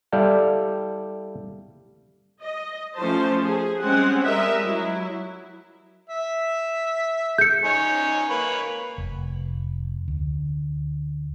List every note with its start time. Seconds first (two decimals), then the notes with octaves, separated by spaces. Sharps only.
0.12 G3 E4 A4 D5 F5 G5
2.42 D#5
2.96 F3 A3 C#4 C5 A5
3.43 G#4
3.81 G3 G#3 C4 C#4 F#5
4.23 G3 A#4 D#5 E5
4.62 F#3 E4
6.10 E5
7.38 G6 C#7
7.65 D#4 C#5 G#5
8.30 A#3 B4 C#5
8.98 F1
10.08 D2